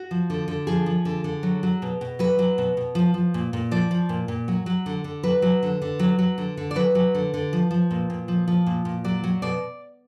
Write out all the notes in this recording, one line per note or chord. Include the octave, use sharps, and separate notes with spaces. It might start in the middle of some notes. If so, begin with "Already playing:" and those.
Already playing: F#4
F3
D3
D3
F3 G#4
F3
D3
D3
F#3
F#3
B2
B2
F#3 B4
F#3
B2
B2
F3
F3
A#2
A#2
F3 D5
F3
A#2
A#2
F#3
F#3
D3
D3
F#3 B4
F#3
D3
D3
F#3
F#3
D3
D3
D5
F#3 B4
F#3
D3
D3
F3
F3
A#2
A#2
F3
F3
A#2
A#2
F#3 D5
F#3
B2 D5